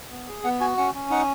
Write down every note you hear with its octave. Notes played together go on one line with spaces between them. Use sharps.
B3
G#4
B3 F#5
F#4 G#5
C#4 F#5
C#4
D#4 F#5